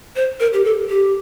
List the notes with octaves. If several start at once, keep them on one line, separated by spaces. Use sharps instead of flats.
C5
A#4
G4
A4
G4